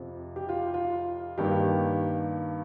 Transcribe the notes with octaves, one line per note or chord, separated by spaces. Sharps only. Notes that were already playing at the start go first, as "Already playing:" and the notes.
Already playing: F2 C3 F3
G4
F4
F4
G2 D#3 A#3 G4